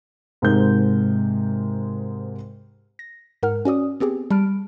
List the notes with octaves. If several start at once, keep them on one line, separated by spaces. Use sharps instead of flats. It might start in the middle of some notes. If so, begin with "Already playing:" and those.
G#2 C3 G#3 D#4 A#4 G6
A#6
G#2 A#4 F#5 F6
C#4 F#4 D5 D#6
B3 C4 G4 G#4
G3 A5 B5 F6 D7